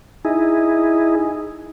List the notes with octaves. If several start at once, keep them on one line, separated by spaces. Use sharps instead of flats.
D#4 E4 G#4